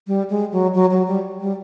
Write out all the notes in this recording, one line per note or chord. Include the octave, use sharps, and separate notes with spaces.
G3
G#3
F#3
F#3
F#3
G3
G3